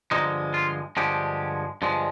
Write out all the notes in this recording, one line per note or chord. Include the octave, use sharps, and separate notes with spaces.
G2 D3 F3 G#3 D#4
F4
G2 D3 F3 G#3 G4
G2 D3 F3 G#3